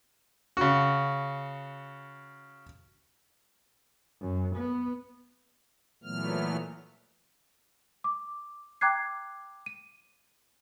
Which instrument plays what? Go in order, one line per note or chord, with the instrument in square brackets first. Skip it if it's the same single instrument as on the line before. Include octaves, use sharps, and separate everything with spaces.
[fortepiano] C#3 F#4
[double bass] F#2
B3
[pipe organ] A#2 E3 F#3 A3 B3 F6
[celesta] D6
G5 A#5 D6 F#6 G#6 C7
D#7